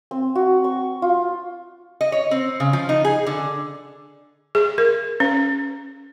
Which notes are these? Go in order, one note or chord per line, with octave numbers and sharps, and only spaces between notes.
C4
F#4
C#6
F4
D#5
C#5
C4
C#3
F3
D#4
G#4
D3
G#4
A#4
C#4